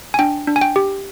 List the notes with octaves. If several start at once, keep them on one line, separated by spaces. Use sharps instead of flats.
G#5
D4 G5
D4
G#5
G5
G4